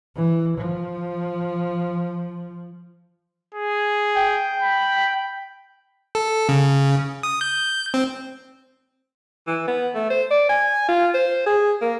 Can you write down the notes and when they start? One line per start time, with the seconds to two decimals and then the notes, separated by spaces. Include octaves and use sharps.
0.16 E3
0.58 F3
3.55 G#4
4.15 G5
4.62 B5
6.15 A4
6.49 C#3
7.23 D#6
7.41 G6
7.94 C4
9.47 E3
9.68 B3
9.95 A3
10.10 C5
10.31 D5
10.49 G#5
10.88 F4
11.14 C5
11.46 G#4
11.81 A#3